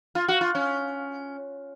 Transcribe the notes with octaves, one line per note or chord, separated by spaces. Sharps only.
F4
F#4
F4
C#4